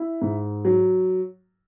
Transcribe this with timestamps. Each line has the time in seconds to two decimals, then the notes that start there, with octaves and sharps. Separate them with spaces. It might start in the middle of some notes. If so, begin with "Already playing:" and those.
Already playing: E4
0.22 G#2
0.65 F#3